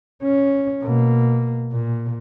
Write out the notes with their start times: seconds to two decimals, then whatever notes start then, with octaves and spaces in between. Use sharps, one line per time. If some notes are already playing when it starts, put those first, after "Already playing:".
0.24 C#4
0.82 B2 A#3
1.72 A#2